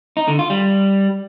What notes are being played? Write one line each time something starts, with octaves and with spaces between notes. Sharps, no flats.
D#4
D3
F4
G3